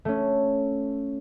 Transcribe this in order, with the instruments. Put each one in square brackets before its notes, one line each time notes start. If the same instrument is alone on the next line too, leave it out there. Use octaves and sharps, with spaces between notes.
[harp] A3 C#4